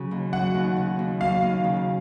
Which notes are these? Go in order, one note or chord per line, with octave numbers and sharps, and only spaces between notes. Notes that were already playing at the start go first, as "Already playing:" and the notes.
Already playing: C#3 F#3
D#2
F#3 F#5
D#2
C#3
D#2
F#3 F5
D#2
C#3